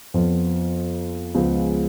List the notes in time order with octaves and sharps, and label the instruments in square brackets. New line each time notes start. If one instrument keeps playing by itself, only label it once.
[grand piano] F2 F3 B3 F4
C#2 C#3 F3 G#3 B3